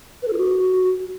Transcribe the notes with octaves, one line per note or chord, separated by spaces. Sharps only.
B4
A4
F4
F#4